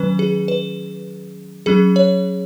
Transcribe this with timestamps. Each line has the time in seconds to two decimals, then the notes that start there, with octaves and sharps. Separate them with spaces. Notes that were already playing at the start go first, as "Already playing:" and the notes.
Already playing: D#3 F#3 C#4 B4
0.19 G#4
0.48 B4
1.66 F#3 C#4 G#4
1.96 C#5